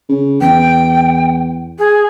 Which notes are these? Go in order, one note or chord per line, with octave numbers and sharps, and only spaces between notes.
C#3
E2 G5
G#4